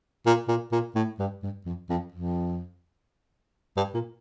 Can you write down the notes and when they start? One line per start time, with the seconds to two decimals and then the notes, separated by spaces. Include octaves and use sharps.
0.26 A#2
0.48 A#2
0.72 A#2
0.95 A2
1.19 G2
1.43 G2
1.65 F2
1.89 F2
2.12 F2
3.77 G2
3.94 A#2